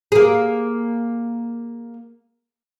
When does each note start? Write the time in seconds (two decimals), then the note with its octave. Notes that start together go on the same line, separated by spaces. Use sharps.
0.12 A#3 G#4